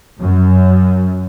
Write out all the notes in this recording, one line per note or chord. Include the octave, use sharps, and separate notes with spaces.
F#2